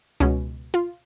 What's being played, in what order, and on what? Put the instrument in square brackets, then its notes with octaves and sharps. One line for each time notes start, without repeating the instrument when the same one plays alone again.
[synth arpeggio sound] C#2 B2 G#3 C#4
F4